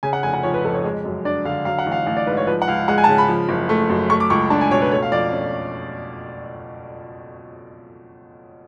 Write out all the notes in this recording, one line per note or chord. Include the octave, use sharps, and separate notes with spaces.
C#3 G#5
F#5
F1 G#5
F#5
F3 C#5
B4
F2 A4
C#5
G#3
F#2
D4 D5
D3 F5
F#3 F5
F#5
A1
F5
A1 F5
D5
G#2 B4
C#5
F3 B4
F#5
C#2 F5
G#3 F#5
G#5
A5
C#3 G#5
B5
F3
F#1
A3
F#2
A3 C#6
D6
C#2 C#6
D4 A5
G#5
B2 C#5
B4
A3 C#5
F5
F2 D5
C#4